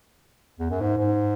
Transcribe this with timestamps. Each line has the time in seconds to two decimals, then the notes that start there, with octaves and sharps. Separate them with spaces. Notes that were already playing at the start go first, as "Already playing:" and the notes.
0.60 E2
0.70 F#2
0.81 G#2
0.97 G#2